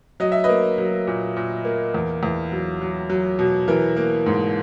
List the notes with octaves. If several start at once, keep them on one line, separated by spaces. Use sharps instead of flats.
F#3 D#5
E5
A#3 B4 D#5
F#3
A#2
A#2
A#3
E2
E2
F#3
F#3
F#3
B2
E3 A#4
A#3
G#2